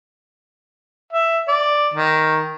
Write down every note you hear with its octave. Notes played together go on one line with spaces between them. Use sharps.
E5
D5
D#3